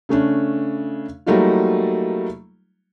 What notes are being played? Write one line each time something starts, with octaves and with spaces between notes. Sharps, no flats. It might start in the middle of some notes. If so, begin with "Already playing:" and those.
C#3 A3 C#4 D4
F#3 G3 A3 A#3 D#4 F4